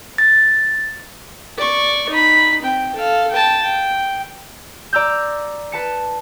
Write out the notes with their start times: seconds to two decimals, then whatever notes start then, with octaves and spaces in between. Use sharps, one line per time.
0.18 A6
1.58 D5 C#6
2.09 D#4 B5
2.62 C4 G5
2.95 A4 F5
3.31 G5 A5
3.63 G5
4.93 D5 A#5 E6 G6
5.72 B4 A5 C#7